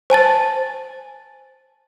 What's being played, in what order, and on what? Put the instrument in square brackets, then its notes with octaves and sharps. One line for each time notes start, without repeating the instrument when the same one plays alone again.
[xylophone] C5 G#5 A5 A6